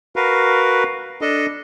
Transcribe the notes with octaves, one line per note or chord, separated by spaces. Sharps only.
F#4 A#4 B4 F5
D4 A4 D#5